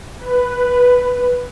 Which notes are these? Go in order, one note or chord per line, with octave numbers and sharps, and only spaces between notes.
B4